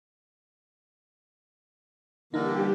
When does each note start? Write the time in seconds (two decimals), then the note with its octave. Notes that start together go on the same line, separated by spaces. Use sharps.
2.34 D3 E3 G3 A#3 D#4 G4